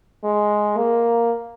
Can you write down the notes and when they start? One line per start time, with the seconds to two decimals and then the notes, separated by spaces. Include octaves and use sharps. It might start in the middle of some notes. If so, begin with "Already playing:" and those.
0.24 G#3
0.77 A#3